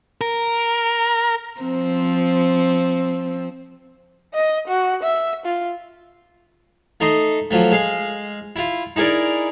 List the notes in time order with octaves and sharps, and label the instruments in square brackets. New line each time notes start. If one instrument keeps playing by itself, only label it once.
[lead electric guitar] A#4
[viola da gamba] F3 C4
[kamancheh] D#5
F#4
E5
F4
[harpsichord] A3 D#4 D#5 C6
F3 F#3 A3
G#3 F5
E4 F4
D#4 E4 G#4 A#4 D5